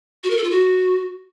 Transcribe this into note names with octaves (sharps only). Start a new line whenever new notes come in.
F#4
A#4
A4
F4
F#4